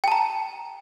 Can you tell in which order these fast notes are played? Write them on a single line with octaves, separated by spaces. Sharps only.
G5 A5 A#5